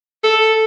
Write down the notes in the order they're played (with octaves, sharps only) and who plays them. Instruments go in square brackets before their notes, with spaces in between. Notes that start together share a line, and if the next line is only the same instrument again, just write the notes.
[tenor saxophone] A4